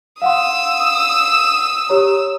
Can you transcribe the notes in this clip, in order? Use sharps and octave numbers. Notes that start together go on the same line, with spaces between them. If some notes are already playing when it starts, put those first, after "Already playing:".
F5 F#5 C6 D#6 E6
G4 C#5 A#5